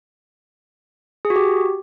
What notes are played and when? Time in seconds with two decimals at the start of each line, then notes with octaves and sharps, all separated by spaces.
1.25 G#4
1.30 F#4
1.36 G4